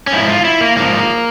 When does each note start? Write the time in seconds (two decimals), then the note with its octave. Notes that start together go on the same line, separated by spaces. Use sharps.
0.07 C#4
0.13 G#2 F3 E4
0.29 F4
0.45 E4
0.61 A#3
0.77 G#2 F3 A#3